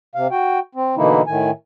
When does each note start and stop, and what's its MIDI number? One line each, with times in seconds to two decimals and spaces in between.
0.15 0.27 48
0.15 0.27 77
0.31 0.59 66
0.31 0.59 79
0.75 0.95 60
0.97 1.22 47
0.97 1.22 50
0.97 1.22 52
0.97 1.22 58
0.97 1.22 63
0.97 1.22 64
1.27 1.51 45
1.27 1.51 51
1.27 1.51 80